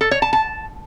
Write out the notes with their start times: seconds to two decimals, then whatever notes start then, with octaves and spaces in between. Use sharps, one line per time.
0.01 A4
0.11 C#5
0.22 A5
0.33 A5